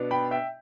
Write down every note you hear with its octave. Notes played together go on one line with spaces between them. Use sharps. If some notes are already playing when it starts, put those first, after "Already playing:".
Already playing: B2 B3 D4
G5 B5
E5 G5